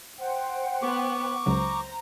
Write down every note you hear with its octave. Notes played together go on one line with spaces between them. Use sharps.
C5 F#5 G5
B3 C#6 D6
C#2 C#3 F#3 C5 A#5